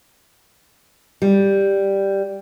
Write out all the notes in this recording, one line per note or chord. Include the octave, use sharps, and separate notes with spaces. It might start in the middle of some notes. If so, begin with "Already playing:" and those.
G3